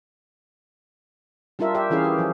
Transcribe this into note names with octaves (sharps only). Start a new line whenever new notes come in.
G3 D4 F4 A#4 E5
G4 E5
E3 C#4 E4 G#4 F5
G4
F3 F#3